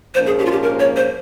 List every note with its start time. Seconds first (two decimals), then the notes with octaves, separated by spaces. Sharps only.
0.14 A#1 G#2 F3 A#3 C#4 C5
0.26 G#4
0.39 G4
0.46 F4
0.51 G4
0.63 A#4
0.80 C#5
0.96 C5